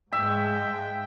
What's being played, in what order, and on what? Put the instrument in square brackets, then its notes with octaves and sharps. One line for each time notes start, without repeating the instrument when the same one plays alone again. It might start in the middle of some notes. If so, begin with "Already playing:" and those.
[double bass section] G#2 G#3 [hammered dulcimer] E5 [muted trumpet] G5